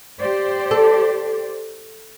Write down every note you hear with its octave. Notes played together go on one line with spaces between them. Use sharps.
G4 C5 D5
A4